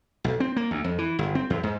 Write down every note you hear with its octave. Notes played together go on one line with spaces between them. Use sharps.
B1
C4
A#3
D2
F2
E3
G1
C4
E2
G#2